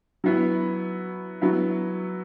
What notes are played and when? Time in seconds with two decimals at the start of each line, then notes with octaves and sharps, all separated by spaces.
0.24 F#3 B3 E4
1.41 F#3 B3 E4